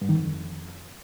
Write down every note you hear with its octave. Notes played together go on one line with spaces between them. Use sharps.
G2
D#3
F2